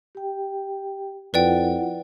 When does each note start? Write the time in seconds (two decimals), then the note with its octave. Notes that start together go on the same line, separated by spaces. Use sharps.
0.15 G4 G5
1.34 F2 E4 F4 B4 D5 F#5 G5